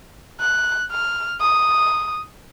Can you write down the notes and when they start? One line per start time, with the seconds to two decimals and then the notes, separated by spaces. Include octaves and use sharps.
0.40 F#6
0.91 F6
1.41 D#6